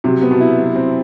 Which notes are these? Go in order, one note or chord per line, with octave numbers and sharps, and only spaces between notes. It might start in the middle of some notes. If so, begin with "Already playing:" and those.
C3 F#3
B3
B2
E4
F#3
C4